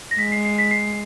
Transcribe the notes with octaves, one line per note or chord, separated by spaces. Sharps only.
A#6
G#3 B6
C7
C7
B6
C7